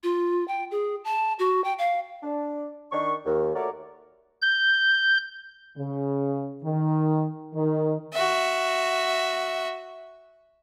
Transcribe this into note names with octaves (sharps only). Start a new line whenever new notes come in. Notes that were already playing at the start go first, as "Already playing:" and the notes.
F4
G5
G#4
A5
F#4
G5
F5
D4
D#3 D4 C#6
D#2
A3 F#4 A#4 C#5 D5
G6
C#3
D#3
D#3
F#4 E5